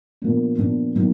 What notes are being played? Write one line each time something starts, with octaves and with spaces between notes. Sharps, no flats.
A#2 F3 B3 D4
A#2 F3 B3 D4
A#2 F#3 B3 D#4 F#4